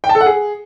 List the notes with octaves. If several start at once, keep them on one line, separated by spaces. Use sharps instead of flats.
G5
A5
A4
F#5
G#4